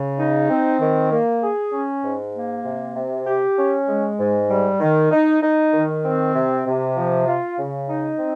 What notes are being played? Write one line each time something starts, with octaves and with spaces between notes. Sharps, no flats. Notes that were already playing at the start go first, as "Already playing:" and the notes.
Already playing: C#3
D#4
C4
D#3
A#3
G#4
C#4
G#2
A#3
C3
C3
G4
C#4
G#3
G#2
G3
D#3
D#4
D#4
D#3
C4
C3
C3
F3
F4
C#3
D#4
C4